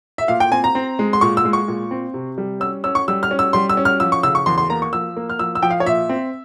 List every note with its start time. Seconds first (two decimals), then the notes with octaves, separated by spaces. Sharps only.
0.18 E5
0.28 A#2 F5
0.40 G5
0.51 C4 G#5
0.64 A#5
0.75 C4
0.99 G#3
1.13 C6
1.21 A#2 C#6
1.37 E6
1.45 G#3
1.53 C#6
1.68 A#2
1.91 C4
2.14 C3
2.38 G3
2.60 C#4 E6
2.84 C#4 E6
2.95 C#6
3.08 G3 E6
3.23 F6
3.31 C#4
3.39 E6
3.53 G3 C6
3.69 E6
3.77 C#4
3.85 F6
4.00 F3 E6
4.12 C#6
4.23 C#3 E6
4.35 C#6
4.46 E2 C6
4.58 C6
4.69 A#3 A#5
4.82 C#6
4.93 F3 E6
5.17 A#3
5.29 F6
5.39 F3 E6
5.55 E6
5.63 F3 G5
5.71 F5
5.80 C#5
5.86 A#2 E5
6.09 C4